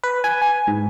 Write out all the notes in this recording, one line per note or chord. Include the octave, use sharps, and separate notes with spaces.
B4
G#5
G#5
G#2